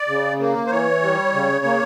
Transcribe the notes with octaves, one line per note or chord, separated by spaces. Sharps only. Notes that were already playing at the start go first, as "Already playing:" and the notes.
Already playing: D5
C#3
A#3
C5
E3 C#5
G3
C#3
A#3